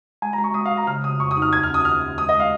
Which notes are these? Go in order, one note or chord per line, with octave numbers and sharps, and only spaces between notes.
G#3 G#5
A#5
G#3
C#6
G#3 D#6
F5
G#3
A#5
C#3 F6
C#3 D#6
F2 C#6
D#6
D#4
F6
D#2 G#6
F6
C#4
D#6
D#3 F6
D#2
G#3 D#6
D#5
G#3 F5